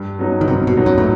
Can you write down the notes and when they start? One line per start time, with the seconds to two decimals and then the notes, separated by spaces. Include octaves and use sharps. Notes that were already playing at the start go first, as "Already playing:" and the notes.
Already playing: G2
0.19 F#3 B3 D#4
0.41 D#3
0.48 G2 C3
0.67 B2
0.77 F#3 B3 D#4
0.86 F#2
0.98 A2